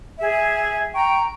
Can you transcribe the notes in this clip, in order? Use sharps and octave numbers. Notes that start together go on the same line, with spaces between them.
G#4 E5
G5 A#5 C#6